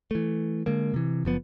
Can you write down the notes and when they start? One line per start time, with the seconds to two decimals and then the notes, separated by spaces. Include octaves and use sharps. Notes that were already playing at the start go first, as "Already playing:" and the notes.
0.11 E3 A3
0.66 D3 G#3 A#3
0.94 C3 E3
1.25 F#1 F3 B3